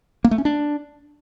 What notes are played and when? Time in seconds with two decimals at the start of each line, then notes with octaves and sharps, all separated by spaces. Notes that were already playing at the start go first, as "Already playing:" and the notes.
0.24 A#3
0.31 A3
0.38 C#4
0.45 D4